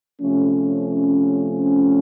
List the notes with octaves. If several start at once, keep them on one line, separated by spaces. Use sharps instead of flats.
C3 F3 A3 C#4